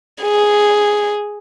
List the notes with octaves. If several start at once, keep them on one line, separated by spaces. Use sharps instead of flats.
G#4